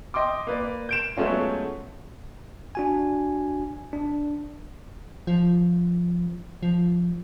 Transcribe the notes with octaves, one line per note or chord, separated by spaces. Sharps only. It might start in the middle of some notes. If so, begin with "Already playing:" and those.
D#5 G5 C6 D6
A#3 B4 D5
G6 D7 E7
F#3 G#3 A3 B3 C#4 F4
D4 F#4 G#5
D4
F3
F3